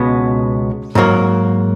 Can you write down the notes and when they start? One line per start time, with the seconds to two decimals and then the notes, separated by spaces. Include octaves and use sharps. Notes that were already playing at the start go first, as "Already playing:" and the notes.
Already playing: C#2 B2 G#3 B3
0.95 G#2 F#3 A#3